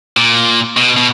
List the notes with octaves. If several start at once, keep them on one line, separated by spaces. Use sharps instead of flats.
A#2
B2
B2